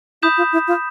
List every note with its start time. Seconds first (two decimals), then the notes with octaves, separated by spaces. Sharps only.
0.22 E4 B5 D#6 G6 B6 E7
0.38 F4
0.53 E4
0.68 F4